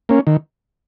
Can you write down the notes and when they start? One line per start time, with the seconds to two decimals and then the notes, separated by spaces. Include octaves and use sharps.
0.09 A#3 C#4
0.27 D#3